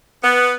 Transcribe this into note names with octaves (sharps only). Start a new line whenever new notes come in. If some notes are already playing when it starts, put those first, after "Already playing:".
B3